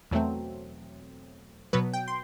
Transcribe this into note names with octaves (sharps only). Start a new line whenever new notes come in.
E2 B2 F#3 A3 C4
B2 F#3 B3 B4
G5
C6